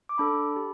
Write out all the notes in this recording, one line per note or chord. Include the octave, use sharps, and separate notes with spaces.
D6
D4 A4 B5
G4